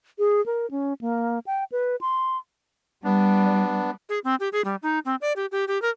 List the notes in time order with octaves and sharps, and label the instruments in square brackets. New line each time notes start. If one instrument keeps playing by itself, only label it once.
[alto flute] G#4
A#4
C#4
A#3
G5
B4
C6
[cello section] G3 [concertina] B3 D4
[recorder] G#4
C4
G4
G#4
G3
D#4
C4
D5
G4
G4
G4
A#4